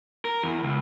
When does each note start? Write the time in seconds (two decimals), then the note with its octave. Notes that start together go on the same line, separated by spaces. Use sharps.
0.25 A#4
0.43 E2
0.63 C#2